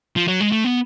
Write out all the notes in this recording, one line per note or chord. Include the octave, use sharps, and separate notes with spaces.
F3
F#3
G#3
A3
B3